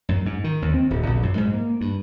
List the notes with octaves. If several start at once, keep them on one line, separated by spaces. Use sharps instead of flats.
F#2
G#2
D#3
D#2
C4
D1
A#1
F#2
G#2
A#3
G2